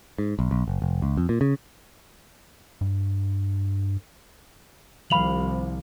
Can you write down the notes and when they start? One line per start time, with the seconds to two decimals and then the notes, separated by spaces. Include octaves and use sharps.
0.18 G#2
0.39 B1
0.51 B1
0.68 F#1
0.82 F1
1.02 C#2
1.17 F2
1.29 A#2
1.41 C#3
2.81 G2
5.10 C2 D#3 F3 F5 B5 F7 F#7